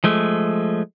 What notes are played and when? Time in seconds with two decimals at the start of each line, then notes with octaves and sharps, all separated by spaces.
0.04 F3 G#3 A3